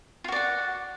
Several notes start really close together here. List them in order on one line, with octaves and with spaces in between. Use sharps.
F4 F#4 D5 F#5